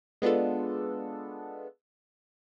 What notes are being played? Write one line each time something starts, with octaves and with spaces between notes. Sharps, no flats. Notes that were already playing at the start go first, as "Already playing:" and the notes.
G#3 B3 D4 F4 A4